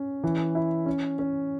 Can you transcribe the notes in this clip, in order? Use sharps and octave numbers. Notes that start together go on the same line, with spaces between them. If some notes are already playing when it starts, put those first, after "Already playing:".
Already playing: C#4
E3
E4
C#4
C#4